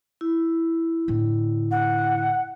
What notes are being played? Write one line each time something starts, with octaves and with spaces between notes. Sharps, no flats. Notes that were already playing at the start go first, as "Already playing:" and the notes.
E4
A2 D3
F#5